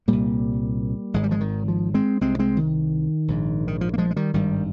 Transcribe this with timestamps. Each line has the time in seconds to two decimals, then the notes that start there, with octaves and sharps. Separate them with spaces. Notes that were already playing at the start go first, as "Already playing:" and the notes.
0.08 C2 A#2 G3 A#3
1.14 G#1 G#2 G#3
1.23 G3
1.31 F3 G#3
1.41 D#3
1.68 F3
1.94 G#3 C4
2.21 C2 C3 G#3 C4
2.39 G#3 C4
2.57 D#3
3.28 A#1 G#2
3.68 D#3
3.81 F3
3.94 A#3
3.98 F3 G#3
4.11 G#3
4.16 D#3 G3
4.34 G#1 G2 D#3 G3